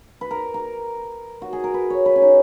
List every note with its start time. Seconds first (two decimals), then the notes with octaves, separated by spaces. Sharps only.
0.21 B4
0.31 A#4
0.54 A#4
1.42 F#4
1.53 G#4
1.64 A#4
1.74 B4
1.90 C#5
2.06 B4
2.16 C#4
2.22 D#4